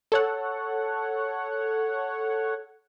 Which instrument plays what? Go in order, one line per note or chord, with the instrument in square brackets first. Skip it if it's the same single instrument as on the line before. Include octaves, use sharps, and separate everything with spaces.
[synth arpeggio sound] A4 C#5 F#5